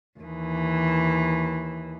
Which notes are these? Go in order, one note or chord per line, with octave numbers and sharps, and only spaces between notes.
D#2 E3